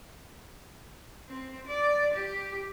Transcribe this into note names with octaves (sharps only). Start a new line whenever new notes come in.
C4
D5
G4